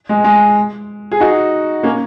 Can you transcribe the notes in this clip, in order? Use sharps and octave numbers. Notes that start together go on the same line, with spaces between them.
G#3
G#3
G#4
D#4 F#4
A#3 C#4